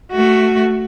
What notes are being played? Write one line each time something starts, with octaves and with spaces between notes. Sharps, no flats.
A3 F#4